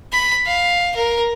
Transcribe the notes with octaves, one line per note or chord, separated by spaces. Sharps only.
B5
F5
A#4